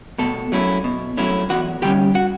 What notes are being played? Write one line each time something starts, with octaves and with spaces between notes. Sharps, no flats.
B2 A3 A4
F#3 A3 C#4 E4
B2
F#3 A3 C#4 E4
E2 F#4 F#5
D3 G3 C#4 G4 G5
F#4 F#5